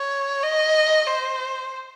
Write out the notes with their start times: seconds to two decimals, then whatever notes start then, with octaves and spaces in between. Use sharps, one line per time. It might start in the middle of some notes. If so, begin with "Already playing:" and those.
Already playing: C#5
0.43 D#5
1.07 C5